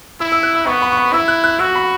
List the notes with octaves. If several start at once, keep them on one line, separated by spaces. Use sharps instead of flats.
E4 E6
E6
F#6
E6
B3 C#6
B5
C#6
B5
E4 E6
F#6
F#6
F#4 E6
B5